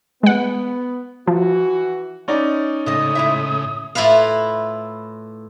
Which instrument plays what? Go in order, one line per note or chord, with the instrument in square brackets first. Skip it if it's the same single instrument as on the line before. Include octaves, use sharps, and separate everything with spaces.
[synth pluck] G#3 F#5 [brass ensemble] B3
[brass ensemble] E3 F#4 [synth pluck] F3
[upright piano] C#4 D#4 D5
[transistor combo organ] A2 C#3 [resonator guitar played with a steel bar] G#3 D#5 [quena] D#6
[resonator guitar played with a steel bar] G#3 E4 E5
[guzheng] A2 E4 F4 B4 F5